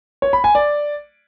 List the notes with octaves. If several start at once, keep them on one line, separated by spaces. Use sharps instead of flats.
C#5
B5
G#5
D5